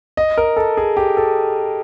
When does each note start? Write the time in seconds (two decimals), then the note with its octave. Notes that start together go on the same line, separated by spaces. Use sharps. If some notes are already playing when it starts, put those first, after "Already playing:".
0.17 D#5
0.38 A#4
0.57 A4
0.77 G#4
0.97 G4
1.17 A4